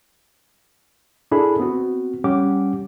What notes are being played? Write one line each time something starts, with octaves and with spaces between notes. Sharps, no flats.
D4 E4 G#4 A4 B5
B3 C4 F#4
G3 C#4 G4 F#5 D6